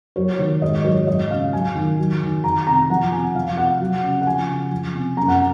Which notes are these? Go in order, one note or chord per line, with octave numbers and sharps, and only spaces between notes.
F#3 C#5
D#3 C#5
G#2 D#5
F#3 C#5
F#3 D#5
C#3 F5
F#3 G#5
D#3
F#3
D#3
D#3 A#5
C3 A#5
F3 F#5
C3 G#5
F3 F5
C3 F#5
F#3
C#3
F#5
F3 G#5
C#3
F3
C3
F#2 A#5
F#5